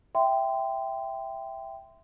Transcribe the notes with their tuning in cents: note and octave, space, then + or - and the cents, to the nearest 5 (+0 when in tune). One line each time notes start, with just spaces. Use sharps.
E5 +0 G5 +0 C6 -20